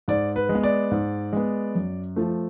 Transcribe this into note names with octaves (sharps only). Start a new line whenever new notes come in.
G#2 D5
B4
G#3
B3
D5
G#2
G#3 B3
F#2
F3 A3